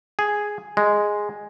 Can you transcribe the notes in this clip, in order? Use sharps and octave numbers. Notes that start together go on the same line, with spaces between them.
G#4
G#3